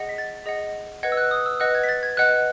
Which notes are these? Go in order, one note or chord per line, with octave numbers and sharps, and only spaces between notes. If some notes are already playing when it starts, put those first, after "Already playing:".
Already playing: G#4 D#5 F#5
B6
A6
G#4 D#5 F#5
B4 D#5 F#5 G#6
E6
F#6
D#6
E6
B4 D#5 F#5 F#6
G#6
B6
A6
G#6
B4 D#5 F#5 F#6